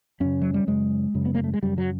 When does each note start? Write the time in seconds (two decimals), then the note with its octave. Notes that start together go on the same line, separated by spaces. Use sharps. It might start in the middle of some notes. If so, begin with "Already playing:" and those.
0.20 F#2 C#3 C#4
0.42 F#3
0.54 G3
0.67 F#2 C#3 G#3
1.14 F#2 C#3
1.25 B3
1.35 A#3
1.44 A3
1.54 G#3
1.62 F#2 C#3 G3
1.78 F#3